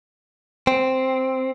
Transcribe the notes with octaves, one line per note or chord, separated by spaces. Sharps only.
C4